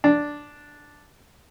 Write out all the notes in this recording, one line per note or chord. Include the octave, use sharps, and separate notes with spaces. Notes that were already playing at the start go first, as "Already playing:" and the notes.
D4